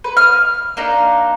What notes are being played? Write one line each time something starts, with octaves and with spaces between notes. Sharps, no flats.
B4
F6
A#3 D4 D#4 A#5